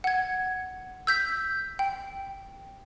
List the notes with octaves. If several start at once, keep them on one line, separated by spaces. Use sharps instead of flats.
F#5 G#6
E6 G6 B6
G5